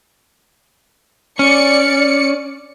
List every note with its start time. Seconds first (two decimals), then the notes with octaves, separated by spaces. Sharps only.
1.39 C#4 D5 C#7